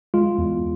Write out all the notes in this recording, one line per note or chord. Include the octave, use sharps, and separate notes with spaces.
G#3 F4
E2